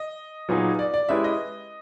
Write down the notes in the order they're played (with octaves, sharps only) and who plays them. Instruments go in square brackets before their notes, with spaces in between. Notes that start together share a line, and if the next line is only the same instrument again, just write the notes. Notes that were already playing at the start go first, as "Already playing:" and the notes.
Already playing: [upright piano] D#5
[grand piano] A#2 F#3 B3 D#4 G#4
[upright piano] D5
D5
[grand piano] G#3 C#4 E4 G4 B4 [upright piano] E5
[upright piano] D#5